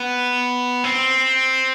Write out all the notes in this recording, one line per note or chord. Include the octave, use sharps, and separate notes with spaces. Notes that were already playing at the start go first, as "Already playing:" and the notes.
Already playing: B3
C4